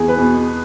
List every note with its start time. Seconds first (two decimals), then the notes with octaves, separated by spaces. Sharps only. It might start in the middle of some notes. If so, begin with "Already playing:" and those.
Already playing: E2 G#4
0.08 B4
0.18 B2